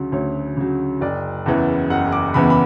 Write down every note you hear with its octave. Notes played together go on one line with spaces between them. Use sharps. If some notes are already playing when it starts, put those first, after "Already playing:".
Already playing: D2 C#3 F#3
D2 C#5
C#3 F#3
F#1 D5
E2 C#3 E3 B3
F#1 F#5
D6
E2 C#3 E3 B3 B5
B5